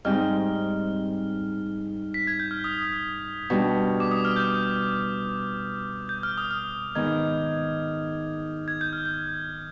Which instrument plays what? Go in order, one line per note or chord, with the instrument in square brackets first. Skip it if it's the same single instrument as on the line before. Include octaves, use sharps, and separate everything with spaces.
[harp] G#2 G3 C4 D#4 [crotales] F6
[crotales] B6
G#6
G6
F6
D#6
[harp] B2 G3 D4
[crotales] D6
D#6
F6
G6
G6
F6
D#6
F6
[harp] G#2 D#3 B3 [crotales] G#6
[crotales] G#6
G6
F6
G6